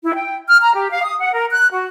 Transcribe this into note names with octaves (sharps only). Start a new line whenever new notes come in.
E4
G5
F6
A#5
G4
F5
D#6
F#5
A#4
F#6
F#4